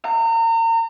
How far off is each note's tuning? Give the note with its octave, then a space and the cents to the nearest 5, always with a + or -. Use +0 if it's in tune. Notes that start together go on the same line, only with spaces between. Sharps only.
A#5 -35